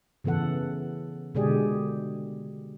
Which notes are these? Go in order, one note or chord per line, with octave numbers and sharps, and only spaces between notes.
C#3 E3 B3 A4 F#5
B2 D3 G#3 G4 G#4 D5